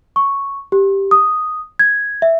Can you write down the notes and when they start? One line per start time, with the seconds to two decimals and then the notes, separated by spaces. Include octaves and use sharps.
0.16 C#6
0.72 G4
1.11 D#6
1.79 G#6
2.22 E5